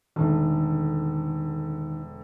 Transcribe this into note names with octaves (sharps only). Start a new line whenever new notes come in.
E1 D3 D#3 A3 D#4